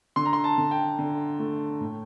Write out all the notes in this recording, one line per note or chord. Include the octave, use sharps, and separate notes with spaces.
D3 C6
A#5
C6
A5
D3
G5
D3
A3
A2